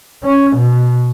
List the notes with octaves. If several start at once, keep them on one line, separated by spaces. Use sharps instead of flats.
C#4
B2